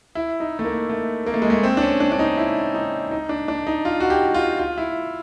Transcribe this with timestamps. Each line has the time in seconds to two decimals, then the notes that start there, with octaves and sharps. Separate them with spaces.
0.15 E4
0.40 D#4
0.59 A3
0.65 A#3
0.90 A3
1.26 A#3
1.34 A3
1.42 G#3
1.50 A3
1.63 C4
1.77 D4
1.82 C#4
2.00 D4
2.12 D4
2.19 D#4
2.37 E4
2.75 D#4
3.11 D#4
3.29 D4
3.48 D4
3.67 D#4
3.85 F4
4.00 F#4
4.10 G4
4.34 F4
4.59 F4
4.78 E4